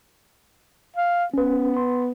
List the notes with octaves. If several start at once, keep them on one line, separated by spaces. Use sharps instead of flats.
F5
B3 C#4 B4
C6